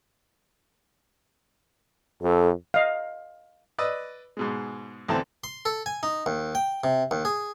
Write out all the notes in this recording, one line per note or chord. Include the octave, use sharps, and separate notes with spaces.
F2 A4
D#5 F5
B4 D5 D#5 D#6 E6
G#2 B2 G#3
D2 E3 A3 C4 A5
C6
A4
G#5
D#4
D#2
G5
C3
D#2
G#4